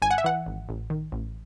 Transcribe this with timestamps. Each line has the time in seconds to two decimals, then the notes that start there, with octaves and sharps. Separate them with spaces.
0.02 G#1 G#5
0.11 F#5
0.18 E5
0.24 E3 F#5
0.46 G#1
0.69 A1
0.90 D#3
1.12 A1